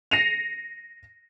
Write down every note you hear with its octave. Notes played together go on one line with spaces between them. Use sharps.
A#6 C7 C#7 D#7 F7